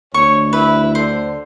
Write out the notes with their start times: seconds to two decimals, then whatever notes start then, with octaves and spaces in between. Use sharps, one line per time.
0.14 D2 C#5 C#6
0.53 E4 B4
0.95 D3 C5